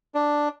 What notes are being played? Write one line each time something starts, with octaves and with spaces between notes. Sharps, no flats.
D4